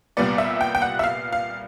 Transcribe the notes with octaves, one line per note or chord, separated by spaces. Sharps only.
C2 A#2 G3 B3 D5
E5
G5
G5
F#5
E5
F5
F5